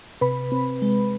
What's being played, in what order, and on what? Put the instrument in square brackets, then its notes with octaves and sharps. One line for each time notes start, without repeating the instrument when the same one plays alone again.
[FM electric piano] C3 B4 B5
C4
G#3